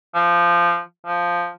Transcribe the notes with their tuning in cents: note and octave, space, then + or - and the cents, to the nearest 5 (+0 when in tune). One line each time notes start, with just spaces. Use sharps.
F3 -15
F3 +0